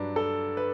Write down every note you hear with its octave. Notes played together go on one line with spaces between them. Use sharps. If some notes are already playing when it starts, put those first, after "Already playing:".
Already playing: G2 F#3 D4 B4
A4
B4